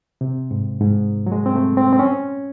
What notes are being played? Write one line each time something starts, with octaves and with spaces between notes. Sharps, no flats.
C3
G#2
G#2
F#3
G#3
C4
A3
C4
C4
C#4